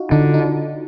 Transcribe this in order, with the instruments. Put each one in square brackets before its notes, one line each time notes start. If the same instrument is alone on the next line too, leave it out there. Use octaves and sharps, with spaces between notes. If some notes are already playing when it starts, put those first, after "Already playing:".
Already playing: [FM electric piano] D#4 F4 F#4
[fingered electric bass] D3 [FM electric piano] D#4
[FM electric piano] D#4